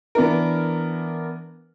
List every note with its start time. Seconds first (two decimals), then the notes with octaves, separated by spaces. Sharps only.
0.15 E3 B3 D4 A#4